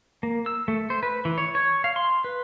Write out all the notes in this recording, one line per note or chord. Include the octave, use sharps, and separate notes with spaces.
A#3
E6
A3
C5
B4
E3
C#5
C#5
F5
C6
B4